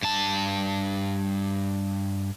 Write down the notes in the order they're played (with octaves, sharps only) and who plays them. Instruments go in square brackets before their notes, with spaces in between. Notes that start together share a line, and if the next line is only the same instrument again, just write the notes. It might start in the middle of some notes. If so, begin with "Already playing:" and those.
[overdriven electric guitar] G2 A5